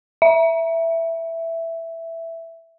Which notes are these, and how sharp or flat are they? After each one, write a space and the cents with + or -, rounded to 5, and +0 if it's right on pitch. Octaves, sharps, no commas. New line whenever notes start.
E5 +5